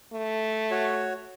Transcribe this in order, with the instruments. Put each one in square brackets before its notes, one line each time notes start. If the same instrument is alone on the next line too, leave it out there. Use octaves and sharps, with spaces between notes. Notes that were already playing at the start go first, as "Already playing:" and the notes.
[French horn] A3
[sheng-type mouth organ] F#4 C#5